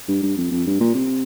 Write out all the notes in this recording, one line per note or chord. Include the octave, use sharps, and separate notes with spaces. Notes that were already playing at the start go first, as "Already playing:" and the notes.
G2
G2
F2
F2
G2
A#2
C3